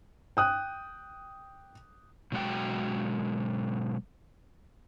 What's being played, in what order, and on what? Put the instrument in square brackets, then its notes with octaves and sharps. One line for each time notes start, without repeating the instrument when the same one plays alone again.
[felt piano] G5 D#6 F#6
[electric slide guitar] B2 F#3 G#3 F#4 G5